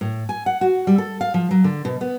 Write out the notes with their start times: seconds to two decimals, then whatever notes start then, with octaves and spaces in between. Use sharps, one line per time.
0.01 A2
0.29 G#5
0.46 F#5
0.61 F#4
0.87 G3
0.98 A4
1.21 F5
1.34 F3
1.51 F#3
1.64 D3
1.85 B2
2.01 B3